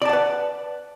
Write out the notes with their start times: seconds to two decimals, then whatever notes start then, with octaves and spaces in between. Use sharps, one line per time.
0.02 D5
0.05 A5
0.09 F#5
0.13 B4